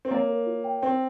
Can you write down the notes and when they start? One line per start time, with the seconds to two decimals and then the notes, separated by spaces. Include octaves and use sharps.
0.05 C4
0.11 A#3 C#5
0.29 A#4
0.46 F4
0.64 G5
0.82 C4 G5